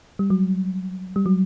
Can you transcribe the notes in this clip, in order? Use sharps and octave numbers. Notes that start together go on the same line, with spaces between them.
G3
F#3
G3
F#3